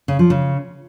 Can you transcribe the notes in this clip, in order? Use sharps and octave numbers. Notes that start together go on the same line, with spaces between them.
C#3
F3
C#3